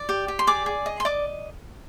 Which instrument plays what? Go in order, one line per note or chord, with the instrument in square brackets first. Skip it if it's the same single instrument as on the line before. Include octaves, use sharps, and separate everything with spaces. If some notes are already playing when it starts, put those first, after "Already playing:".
Already playing: [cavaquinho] D5
G4
G4
C6
G#4 D5 D6
G#4
D#5
C6
D5 D#5 D6